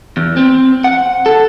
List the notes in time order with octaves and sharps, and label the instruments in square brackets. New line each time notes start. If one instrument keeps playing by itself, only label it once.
[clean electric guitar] E2
C4
F#5
A4